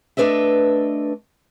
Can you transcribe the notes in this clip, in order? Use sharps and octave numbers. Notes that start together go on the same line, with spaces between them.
A3 D4 B4 D#5 E5